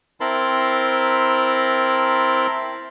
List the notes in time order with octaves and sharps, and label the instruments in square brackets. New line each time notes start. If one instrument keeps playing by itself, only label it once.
[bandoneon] C4 E4 A#4 A5 B5 C6